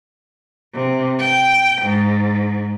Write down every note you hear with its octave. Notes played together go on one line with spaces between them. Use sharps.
C3
G5
G#2